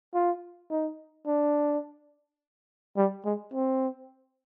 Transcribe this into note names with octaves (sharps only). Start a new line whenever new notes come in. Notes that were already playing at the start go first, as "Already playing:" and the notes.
F4
D#4
D4
G3
G#3
C4